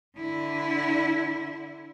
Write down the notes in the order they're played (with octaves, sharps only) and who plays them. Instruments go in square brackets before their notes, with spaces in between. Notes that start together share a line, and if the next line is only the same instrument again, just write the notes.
[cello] D3 E4